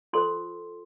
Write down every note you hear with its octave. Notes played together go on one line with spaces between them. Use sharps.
F4 A4 C5 C6